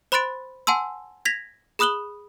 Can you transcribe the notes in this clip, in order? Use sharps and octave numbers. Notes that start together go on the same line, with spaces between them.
C5 B5 C6 F#6 A6 D7
F#5 G#5 A5 C6 E6
G#6 A#6 B6 F7
G#4 B5 D#6 F#6 F#7 G7